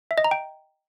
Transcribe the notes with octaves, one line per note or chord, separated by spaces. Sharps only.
E5
D#5
A#5
G5